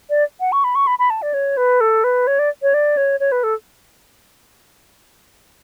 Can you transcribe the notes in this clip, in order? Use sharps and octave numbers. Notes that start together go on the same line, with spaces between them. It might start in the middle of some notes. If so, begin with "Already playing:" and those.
D5
F#5
C#6
B5
C#6
B5
B5
A5
D5
C#5
B4
A4
B4
C#5
D5
C#5
D5
C#5
C#5
B4
A4